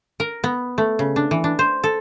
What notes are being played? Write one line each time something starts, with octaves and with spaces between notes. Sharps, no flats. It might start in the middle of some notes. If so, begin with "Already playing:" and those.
A#4
B3
A3
C#3
D4
E3
D4
C5
A4